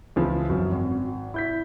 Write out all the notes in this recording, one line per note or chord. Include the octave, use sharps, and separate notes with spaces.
C#2 E3 F3
F#2
G#1
E4 G6 B6